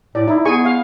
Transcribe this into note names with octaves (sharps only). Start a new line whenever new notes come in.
A2 D5
D#4 E4
B3 G#4 G#5 C#6
F5